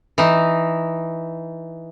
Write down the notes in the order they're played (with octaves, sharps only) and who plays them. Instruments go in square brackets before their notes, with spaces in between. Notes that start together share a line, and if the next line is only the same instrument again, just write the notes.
[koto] E3 D#4